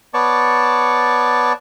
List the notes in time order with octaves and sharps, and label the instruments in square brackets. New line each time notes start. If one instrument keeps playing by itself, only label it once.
[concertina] B3 C#5 D5 A5 C#6